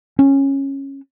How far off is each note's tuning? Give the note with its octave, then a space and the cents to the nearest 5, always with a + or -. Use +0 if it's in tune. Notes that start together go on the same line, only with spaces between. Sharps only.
C#4 -15